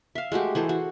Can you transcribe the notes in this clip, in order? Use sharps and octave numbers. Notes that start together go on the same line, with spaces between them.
E5 F5
G#3 A3 F#4 G4
E3 G#4 A4 C5
F#4